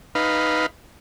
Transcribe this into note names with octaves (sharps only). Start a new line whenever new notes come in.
D#4 B4 F5